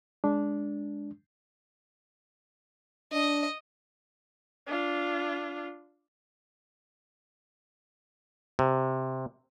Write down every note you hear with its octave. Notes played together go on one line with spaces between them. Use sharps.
G#3 D4
D4 D#5
D4 F4
C3